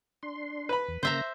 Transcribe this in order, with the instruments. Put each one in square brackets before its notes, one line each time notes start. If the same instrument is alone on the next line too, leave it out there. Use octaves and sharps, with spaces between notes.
[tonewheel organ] D4 C6
[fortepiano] B4 B5
[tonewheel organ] E2
[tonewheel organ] C#3 A#3 A#6 [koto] C5 E5 A#5